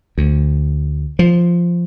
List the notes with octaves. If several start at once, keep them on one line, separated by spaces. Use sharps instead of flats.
D2
F3